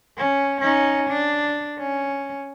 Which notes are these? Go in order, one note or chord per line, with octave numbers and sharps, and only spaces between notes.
C#4
C#4 D#4
D4
C#4